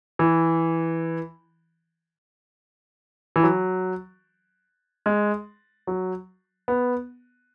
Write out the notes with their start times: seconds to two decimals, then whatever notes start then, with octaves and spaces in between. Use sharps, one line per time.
0.19 E3
3.36 E3
3.43 F#3
5.06 G#3
5.87 F#3
6.68 B3